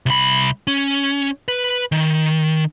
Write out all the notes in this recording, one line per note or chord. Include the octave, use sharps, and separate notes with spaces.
C2 B5
C#4
B4
D#3